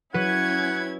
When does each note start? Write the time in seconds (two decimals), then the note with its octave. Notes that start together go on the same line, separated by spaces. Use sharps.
0.14 F#3 C#4 E4 B4 F#5 G#6 D#7